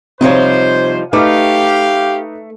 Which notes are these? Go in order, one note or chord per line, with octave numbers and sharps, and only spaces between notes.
C3 F3 G3 D#4 C5 C#5
A3 D#4 G4 B4 F5 D6